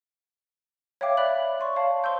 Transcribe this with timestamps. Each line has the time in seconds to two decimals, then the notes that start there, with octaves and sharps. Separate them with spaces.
1.01 C#5 E5 F5 G5 D6
1.17 D5 E5 B5 F#6 F#7
1.60 D5 C6 C#6
1.76 C#5 F5 A5
2.04 C5 C6 E6 G6